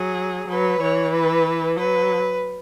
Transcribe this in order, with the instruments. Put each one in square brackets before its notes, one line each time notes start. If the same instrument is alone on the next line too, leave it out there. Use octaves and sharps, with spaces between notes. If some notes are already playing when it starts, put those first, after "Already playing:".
Already playing: [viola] F#3 [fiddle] G#4
[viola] F#3 [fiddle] B4
[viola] E3 [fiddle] C#5
[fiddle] B4
[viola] F#3 [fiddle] B4